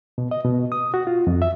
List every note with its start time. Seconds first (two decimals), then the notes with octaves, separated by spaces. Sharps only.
0.18 B2
0.31 D#5
0.45 B2
0.72 D#6
0.94 F#4
1.07 F4
1.27 F2
1.42 E5